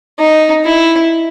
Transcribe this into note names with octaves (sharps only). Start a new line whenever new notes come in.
D#4
E4